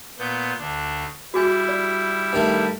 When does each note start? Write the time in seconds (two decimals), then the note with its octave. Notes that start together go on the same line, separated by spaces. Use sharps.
0.18 A#2 B3 G6
0.59 D2 D4
1.34 G3 E4 F#4 G#4 G#5
1.69 D5
2.33 G2 D#3 A3